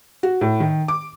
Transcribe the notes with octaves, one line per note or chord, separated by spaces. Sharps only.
F#4
A2
D#3
D6